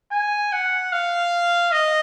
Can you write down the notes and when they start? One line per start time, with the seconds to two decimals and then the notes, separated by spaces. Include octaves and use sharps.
0.11 G#5
0.52 F#5
0.92 F5
1.72 D#5